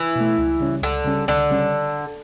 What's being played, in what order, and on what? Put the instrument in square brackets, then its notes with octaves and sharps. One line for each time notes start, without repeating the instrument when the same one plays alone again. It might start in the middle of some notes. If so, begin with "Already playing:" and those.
Already playing: [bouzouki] E3
[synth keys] B2 A3
C#2
C#3 G3 C#4
[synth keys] C#2 [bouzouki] D3
[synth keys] C#3 G3 C#4
[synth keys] C#2 [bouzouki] D3
[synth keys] C#3 G3 C#4